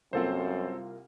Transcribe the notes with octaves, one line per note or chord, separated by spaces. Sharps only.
C2 F#2 A#3 C4 F4 A4 C5